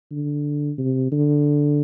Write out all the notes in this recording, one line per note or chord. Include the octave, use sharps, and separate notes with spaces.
D3
C3
D3